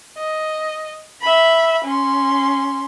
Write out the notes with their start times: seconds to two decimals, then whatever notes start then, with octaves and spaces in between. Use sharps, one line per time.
0.18 D#5
1.22 E5 B5
1.85 C#4 C6